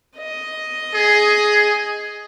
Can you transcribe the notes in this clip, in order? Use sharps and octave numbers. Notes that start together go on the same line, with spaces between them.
D#5
G#4